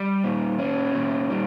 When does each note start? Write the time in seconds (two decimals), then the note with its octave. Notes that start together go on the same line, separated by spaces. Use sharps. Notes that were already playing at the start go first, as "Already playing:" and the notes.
Already playing: G3
0.24 A#2
0.58 C#4
0.94 A#2
1.30 G3